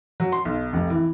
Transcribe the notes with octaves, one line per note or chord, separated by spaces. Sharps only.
F#3
C6
B1
F1
E3